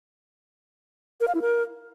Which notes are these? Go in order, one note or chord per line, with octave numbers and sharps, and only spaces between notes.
A#4
F5
E4
A#4